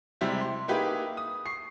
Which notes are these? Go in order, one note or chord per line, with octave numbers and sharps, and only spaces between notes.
C3 G3 G#3 C4 E4 G4
C6
A#3 D#4 E4 G4 G#4 B4
D#6
C#6 C7